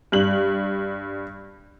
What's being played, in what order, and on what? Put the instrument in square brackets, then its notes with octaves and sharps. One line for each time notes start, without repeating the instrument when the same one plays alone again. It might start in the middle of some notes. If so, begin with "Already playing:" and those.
[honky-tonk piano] G2 F#7